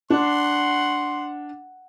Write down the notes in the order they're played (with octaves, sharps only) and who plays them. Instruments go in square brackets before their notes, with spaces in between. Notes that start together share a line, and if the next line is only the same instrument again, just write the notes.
[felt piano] D4 [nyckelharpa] F#5 [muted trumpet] C6